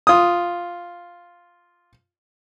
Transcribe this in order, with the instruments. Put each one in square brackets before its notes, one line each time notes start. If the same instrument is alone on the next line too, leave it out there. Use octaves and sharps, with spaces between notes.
[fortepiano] F4 D#6